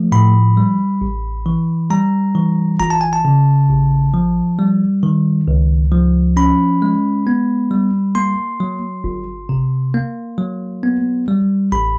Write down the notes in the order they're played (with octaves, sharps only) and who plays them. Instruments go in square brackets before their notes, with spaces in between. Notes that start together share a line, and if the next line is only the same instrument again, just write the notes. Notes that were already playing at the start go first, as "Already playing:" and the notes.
Already playing: [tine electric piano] F3 A3
A2 B5
G3
A1
E3
G3 A#5
E3
G1 A#5
A5
G#5
A5
C#3
A1
F3
G3
D#3
C#2
F3
C#4 B5
G#3
B3
G3
A#3 C6
F#3
G1
C3
A#3
F#3
B3
G3
A1 B5